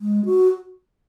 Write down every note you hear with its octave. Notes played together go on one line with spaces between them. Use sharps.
G#3
F#4